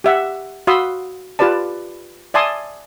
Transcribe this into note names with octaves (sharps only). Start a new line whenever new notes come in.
G4 E5 F#5
F#4 F5 B5 C6 D#6 E6
F4 G4 B4 D5 A5
D5 E5 G#5 A5 C6 D#6